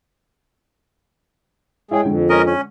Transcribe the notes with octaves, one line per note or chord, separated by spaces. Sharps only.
G#3 E4 G#4 C#5 G5
F2 D3 G#3
C#4 A#4 D#5
C#4